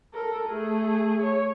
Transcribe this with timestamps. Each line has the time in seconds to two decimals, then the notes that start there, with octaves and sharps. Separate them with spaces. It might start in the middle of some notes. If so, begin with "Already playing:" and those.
0.14 A4 A#4
0.48 A3 G#4
1.22 C#5